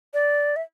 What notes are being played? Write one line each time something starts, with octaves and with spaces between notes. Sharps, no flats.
D5
E5